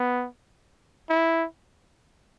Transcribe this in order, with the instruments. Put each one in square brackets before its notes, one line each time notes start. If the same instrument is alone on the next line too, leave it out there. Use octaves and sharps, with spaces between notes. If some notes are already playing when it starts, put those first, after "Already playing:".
Already playing: [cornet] B3
E4